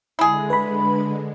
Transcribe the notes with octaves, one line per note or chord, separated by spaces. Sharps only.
D3 G#3 E4 G#4
B4 B5